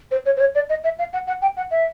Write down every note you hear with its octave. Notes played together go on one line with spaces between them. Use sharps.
C5
C#5
C5
C#5
D5
D#5
E5
F5
F#5
F#5
G5
F#5
E5